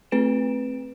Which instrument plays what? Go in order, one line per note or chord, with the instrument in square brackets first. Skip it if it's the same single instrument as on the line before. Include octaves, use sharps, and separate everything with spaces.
[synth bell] A3 C4 B4 D7 E7